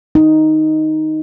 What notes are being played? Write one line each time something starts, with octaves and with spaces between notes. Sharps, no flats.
D#4